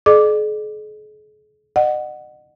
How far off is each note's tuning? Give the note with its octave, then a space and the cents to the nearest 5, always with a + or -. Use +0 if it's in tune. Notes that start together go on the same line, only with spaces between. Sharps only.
G#4 +45 D5 +45 D6 +0
D#5 -40 F#5 +0